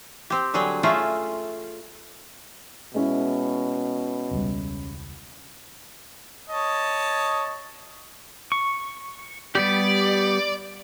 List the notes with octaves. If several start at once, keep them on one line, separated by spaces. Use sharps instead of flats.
C4 G4
D3 F#3 G3 G#4 G5
A3 C#4 F4 G#4 E5 A#5
B2 G#3 C#4 E4
E1 C#2 G3
C#5 D#5 A5
C#6
G3 B3 G4 D5